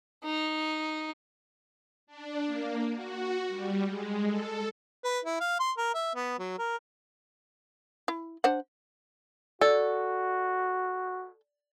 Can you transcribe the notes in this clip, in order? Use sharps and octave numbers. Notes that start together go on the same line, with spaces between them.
D#4
D4
A#3
F#4
G3
G#3
A4
B4
E4
F5
C6
A#4
E5
B3
F#3
A#4
E4
D4 C5 F#5
F#4 A4 D5